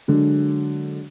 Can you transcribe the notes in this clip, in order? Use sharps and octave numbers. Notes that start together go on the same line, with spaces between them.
D3 F#3 G#3